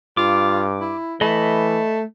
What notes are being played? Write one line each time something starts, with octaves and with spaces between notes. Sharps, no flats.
G2 F4 D6
E4
E3 A3 D#5 B5